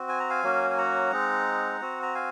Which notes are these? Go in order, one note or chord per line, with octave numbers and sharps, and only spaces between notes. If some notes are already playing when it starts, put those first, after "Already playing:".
Already playing: C4 F#4
G#5
A#5
F5 G#5
F#3 A#3 C#4 F#4
G#5
F#5 A#5
G#3 C4 D#4
C4 F#4
A#5
F5 G#5